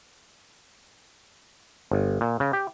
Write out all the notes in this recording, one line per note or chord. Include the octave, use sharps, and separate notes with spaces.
G1
A#2
C#3
G4